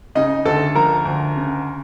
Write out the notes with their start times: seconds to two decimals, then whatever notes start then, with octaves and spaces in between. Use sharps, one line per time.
0.15 C#3 D#4 D#5
0.45 D2 A4 A5
0.75 F3 A#4 A#5
1.05 D2
1.36 C#3